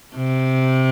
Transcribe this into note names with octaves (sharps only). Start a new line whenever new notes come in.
C3